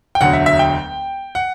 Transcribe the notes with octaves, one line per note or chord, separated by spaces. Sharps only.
G5
E1 D2 D3 F#3 F#5
E5
E5
G5
F#5